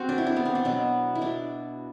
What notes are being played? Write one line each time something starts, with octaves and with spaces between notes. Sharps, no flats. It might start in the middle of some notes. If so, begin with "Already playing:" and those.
Already playing: C4 F#4
D4
E4
D4
B3
C4
D4
B2 F#3 B3
E4
D4